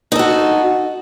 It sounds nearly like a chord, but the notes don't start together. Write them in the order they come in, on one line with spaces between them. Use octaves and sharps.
D#4 A4 F#4